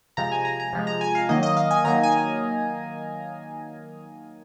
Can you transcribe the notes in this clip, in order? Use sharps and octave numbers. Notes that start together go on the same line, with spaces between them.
C3 F3 G#3 A#5
G#5
A#5
A#5
C3 F3 G#3
A#5
G#5
F5
D#3 F#3 A#3 D#5
D#5
F5
G#5
D#3 F#3 A#3 A#5
G#5